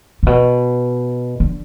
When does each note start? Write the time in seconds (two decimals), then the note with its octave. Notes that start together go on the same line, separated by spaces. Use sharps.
0.23 A#2
0.27 B2
1.40 D3